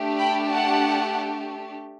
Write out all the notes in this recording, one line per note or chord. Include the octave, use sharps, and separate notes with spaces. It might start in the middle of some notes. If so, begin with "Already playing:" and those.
Already playing: A3 D4 G4
G5 B5
F#5 A5